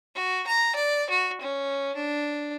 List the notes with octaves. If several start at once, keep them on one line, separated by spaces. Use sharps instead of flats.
F#4
A#5
D5
F#4
C#4
D4